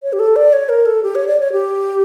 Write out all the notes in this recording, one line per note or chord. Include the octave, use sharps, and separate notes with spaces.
C#5
G4
A4
D5
C#5
A#4
A4
G4
C#5
D5
C#5
G4